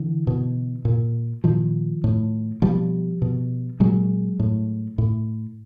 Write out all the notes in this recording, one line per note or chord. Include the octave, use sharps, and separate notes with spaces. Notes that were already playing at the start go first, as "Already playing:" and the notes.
Already playing: D3 E3
B2
A#2
A#2 D#3 F3
A2
B2 F3 G3
B2
A#2 F#3 G#3
A2
A2